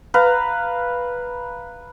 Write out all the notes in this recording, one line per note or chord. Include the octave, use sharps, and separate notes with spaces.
B4 F5 A#5